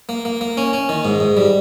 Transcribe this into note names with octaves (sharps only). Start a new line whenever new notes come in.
A#3
A#3
A#3
C#4
C#4
D#3
G#2
G#2
G3